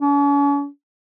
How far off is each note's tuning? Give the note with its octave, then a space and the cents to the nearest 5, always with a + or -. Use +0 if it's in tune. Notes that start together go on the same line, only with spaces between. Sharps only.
C#4 +45